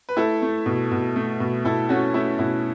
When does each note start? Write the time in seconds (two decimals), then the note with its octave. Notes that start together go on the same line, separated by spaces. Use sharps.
0.09 B4
0.17 A3 E4 A4
0.42 A3
0.66 B2
0.91 B2
1.16 A3
1.40 B2
1.64 B2 E4 A4
1.89 A3 C#4 F#4
2.14 A3 E4
2.39 B2 E4